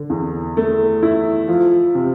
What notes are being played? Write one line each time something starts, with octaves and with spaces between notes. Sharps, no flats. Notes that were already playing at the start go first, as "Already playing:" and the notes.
Already playing: D3
E2
A3
E4
F3
C3